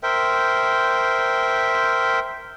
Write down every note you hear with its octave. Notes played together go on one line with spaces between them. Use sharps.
A#4 C5 E5 G5